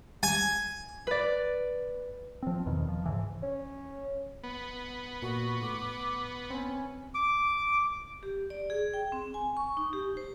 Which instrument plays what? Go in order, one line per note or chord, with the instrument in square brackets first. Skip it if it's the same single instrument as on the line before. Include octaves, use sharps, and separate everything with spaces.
[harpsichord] G#5
[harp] B4 D5
[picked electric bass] F3 C4
F1 E2 B2 D#3
F3
G#2 C#3 E3
[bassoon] C#4
[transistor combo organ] B3
[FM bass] A#2 [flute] F#4
[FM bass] A2 [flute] D6
[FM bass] C4 [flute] C#4
[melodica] D6
[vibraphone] G4
D5
G#4
G5
C4
G#5
C#6
D#4
G4
C5